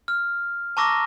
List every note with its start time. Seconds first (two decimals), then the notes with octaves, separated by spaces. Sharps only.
0.08 F6
0.77 A5 A#5 C#6 D6 E6 A#6